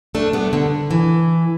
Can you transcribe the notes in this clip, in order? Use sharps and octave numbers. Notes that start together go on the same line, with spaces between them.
A3 D4
G3 B3
D3
E3